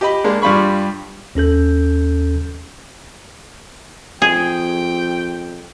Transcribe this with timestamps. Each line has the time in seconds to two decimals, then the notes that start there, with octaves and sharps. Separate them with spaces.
0.01 G4 D#5 B5
0.24 G#3 A#3 D4
0.42 G2 G3 F4 B5 C#6
1.35 D#2 C#4 A4 G6
4.22 F2 G#4 G5